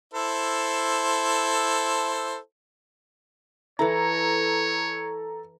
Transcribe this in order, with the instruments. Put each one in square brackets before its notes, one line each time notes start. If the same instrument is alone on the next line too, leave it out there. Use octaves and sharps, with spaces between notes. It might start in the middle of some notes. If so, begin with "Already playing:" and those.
[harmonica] E4 A4 C5
[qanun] E3 E4 [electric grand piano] A4 A#5 [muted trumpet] C#5